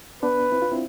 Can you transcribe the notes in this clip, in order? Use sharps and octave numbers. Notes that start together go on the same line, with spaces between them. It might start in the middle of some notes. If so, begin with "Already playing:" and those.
B3 D4 B4
C4 E4
D4 F4
C4 E4